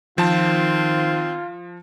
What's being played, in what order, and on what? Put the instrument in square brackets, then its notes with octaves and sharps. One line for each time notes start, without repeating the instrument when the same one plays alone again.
[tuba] D#3 [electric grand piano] F3 A5 [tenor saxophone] C4 [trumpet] F4